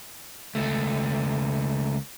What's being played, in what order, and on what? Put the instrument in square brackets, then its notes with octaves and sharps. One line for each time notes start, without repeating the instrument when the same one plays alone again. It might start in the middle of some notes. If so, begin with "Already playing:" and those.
[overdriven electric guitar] C#2 A3